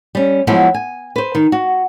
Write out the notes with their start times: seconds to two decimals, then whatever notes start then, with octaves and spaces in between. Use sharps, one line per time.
0.15 G3 C#4
0.47 F3 F#3 G#3 B3 E4 F#4
0.74 G#5
1.16 B4 C5
1.35 D#3
1.52 F#4